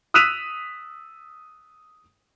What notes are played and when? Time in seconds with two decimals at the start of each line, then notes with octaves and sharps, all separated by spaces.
0.14 D#6 E6 F#6 B6 D#7 F7